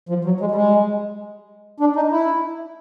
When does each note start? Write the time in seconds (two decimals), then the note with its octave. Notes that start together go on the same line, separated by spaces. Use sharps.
0.09 F3
0.25 F#3
0.40 G#3
0.51 G3
0.55 G#3
1.80 D4
1.96 D#4
2.11 E4